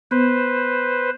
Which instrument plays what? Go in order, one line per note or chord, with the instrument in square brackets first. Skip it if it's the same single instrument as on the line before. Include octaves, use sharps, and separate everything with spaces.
[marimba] B3 [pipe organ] B4 C5